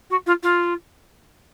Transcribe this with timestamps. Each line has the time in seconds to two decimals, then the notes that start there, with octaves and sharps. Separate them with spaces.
0.10 F#4
0.27 F4
0.43 F4